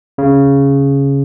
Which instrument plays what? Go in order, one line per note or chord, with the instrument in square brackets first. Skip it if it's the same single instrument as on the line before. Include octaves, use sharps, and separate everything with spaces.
[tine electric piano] C#3